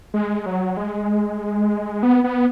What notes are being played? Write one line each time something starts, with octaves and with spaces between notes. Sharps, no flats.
G#3
F#3
G#3
B3
B3